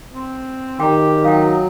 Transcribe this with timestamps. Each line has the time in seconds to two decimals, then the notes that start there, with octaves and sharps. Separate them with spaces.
0.14 C4
0.80 D#3 G4 G5 A#5
1.24 F#3 D#4 F5 G5